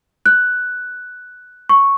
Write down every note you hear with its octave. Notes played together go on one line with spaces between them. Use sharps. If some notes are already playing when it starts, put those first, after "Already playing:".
F#6
C#6